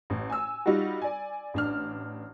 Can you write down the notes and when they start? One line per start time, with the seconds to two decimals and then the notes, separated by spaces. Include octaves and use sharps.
0.10 A1
0.30 G#5 E6
0.66 G3 D#4 F4 F#4
1.02 D5 G#5
1.54 A1 D4 F6